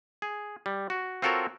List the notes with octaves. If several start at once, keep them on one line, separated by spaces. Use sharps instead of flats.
G#4
G3
F#4
C4 F4 F#4 A4 A#4 C#5